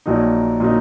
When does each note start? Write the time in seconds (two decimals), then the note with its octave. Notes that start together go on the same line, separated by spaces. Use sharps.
0.06 A#1 A#2 F#3 A#3 D#4
0.60 A#2 F#3 A#3 D#4